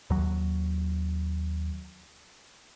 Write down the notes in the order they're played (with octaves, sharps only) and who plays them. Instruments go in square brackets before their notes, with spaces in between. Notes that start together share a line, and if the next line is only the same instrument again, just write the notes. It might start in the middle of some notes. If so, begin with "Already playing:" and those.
[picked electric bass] D#2 F#3